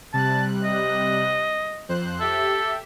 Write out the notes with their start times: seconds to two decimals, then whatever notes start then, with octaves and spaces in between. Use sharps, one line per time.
0.13 C3 G3 A5 F#6
0.64 D#5
1.89 F2 C5 F#6
2.20 G4 A4 E5